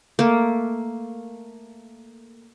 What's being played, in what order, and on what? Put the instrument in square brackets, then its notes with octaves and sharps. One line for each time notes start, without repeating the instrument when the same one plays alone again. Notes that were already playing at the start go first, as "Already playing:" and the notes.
[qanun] A3 A#3